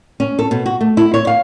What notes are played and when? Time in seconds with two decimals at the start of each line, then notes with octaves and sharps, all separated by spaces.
0.20 C#4
0.39 A4
0.51 B2
0.66 F#4
0.81 A3
0.97 E4
1.14 C#5
1.27 F5